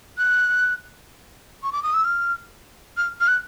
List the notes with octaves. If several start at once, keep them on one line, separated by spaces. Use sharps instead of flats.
F#6
C#6
D6
D#6
E6
F6
F6
F6
F#6